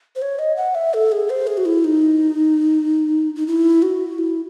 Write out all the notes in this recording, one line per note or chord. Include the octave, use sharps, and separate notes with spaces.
C5
C#5
D#5
F#5
E5
A4
G#4
C5
G#4
F#4
E4
D#4
D#4
E4
F#4
E4